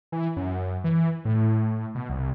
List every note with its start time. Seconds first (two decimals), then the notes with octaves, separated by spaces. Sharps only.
0.12 E3
0.37 F#2
0.84 E3
1.25 A2
1.95 B2
2.10 C2